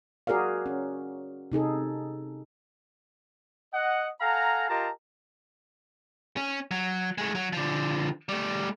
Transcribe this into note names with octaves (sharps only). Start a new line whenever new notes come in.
F#4 G#4 A#4 D5 F5
C#4
C3 D#4 G#4 A4
D#5 F#5
A4 F5 F#5 G#5 A#5
F4 G4 A#4 D#5 A5 A#5
C#4
F#3
G#3 A3
F#3
D3 F3
G3 A3